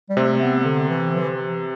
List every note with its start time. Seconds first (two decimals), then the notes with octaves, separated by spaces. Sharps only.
0.10 G3
0.17 C3 A3 C4
0.42 B3
0.65 D3
0.90 E3
1.14 F3
1.21 E3